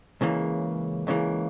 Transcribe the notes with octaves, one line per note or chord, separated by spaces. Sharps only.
C#2 C#3 E3 A#3
C#2 C#3 E3 A#3